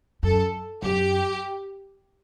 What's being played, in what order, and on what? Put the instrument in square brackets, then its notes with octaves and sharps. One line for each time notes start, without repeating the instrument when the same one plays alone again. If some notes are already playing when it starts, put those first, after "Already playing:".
[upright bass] F#2 [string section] A4
[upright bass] F#2 [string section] G4